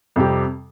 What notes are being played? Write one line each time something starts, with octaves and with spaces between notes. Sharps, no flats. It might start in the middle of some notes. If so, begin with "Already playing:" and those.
F2 C3 G3 C4 G4